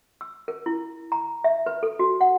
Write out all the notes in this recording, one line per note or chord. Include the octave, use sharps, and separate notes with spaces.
E6
A#4
E4
A#5
E5
B4
A4
F#4
F#5